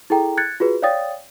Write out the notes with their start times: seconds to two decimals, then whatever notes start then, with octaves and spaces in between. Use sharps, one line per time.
0.10 E4 G#4 A4 G5 A#5
0.37 F#6 G#6 A6 C#7
0.60 F4 F#4 G#4 B4
0.82 C#5 D5 F5 G5 D#6 A6